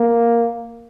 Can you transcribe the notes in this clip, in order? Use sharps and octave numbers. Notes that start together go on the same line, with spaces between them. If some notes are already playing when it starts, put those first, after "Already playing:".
Already playing: A#3